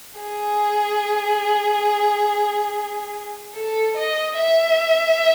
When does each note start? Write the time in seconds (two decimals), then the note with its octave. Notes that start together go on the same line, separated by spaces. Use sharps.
0.19 G#4
3.55 A4
3.97 D#5
4.38 E5